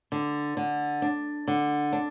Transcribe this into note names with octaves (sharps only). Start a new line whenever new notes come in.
D3
D3
D4
D3
D4